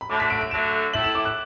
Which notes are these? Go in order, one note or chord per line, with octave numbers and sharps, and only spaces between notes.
B5
D3 F#3 A3 D6
B6
D7
D7
D3 F#3 A3 E7
A2 A3 E4 F#7
E7
D6
F#6